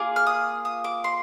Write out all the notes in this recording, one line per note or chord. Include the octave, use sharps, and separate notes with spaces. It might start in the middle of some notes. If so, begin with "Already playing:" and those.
Already playing: A#3 F4 G#4 D6
F6
D#6
D#6
D6
C6